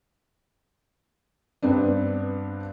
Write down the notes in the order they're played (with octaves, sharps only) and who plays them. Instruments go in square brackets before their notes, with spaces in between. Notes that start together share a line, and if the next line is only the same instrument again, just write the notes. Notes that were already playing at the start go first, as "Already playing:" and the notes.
[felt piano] G2 B3 C4 D4